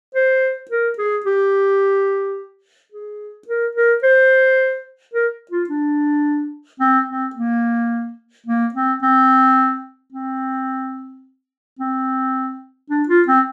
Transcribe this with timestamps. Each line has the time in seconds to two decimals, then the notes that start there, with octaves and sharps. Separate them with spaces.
0.15 C5
0.71 A#4
0.98 G#4
1.26 G4
2.92 G#4
3.47 A#4
3.75 A#4
4.03 C5
5.14 A#4
5.51 F4
5.69 D4
6.80 C4
7.08 C4
7.35 A#3
8.47 A#3
8.74 C4
9.02 C4
10.13 C4
11.79 C4
12.90 D4
13.08 F4
13.27 C4